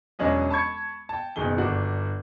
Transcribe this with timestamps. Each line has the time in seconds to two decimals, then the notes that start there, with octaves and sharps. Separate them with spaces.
0.19 E1 F#3 C#4 D4 D#5
0.50 A5 B5 C#6 G#6 C#7
1.09 G5 A5
1.36 F#1 B2 D#3 G#4 G7
1.58 G1 D4 F#4